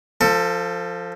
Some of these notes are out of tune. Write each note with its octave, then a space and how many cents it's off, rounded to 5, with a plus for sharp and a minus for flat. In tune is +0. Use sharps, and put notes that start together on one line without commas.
F3 +0 A4 +25